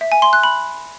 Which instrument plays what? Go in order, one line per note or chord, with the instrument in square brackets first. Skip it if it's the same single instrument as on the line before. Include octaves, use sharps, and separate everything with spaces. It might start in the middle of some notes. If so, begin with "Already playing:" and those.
[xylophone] E5
G#5
C6
F#6
B5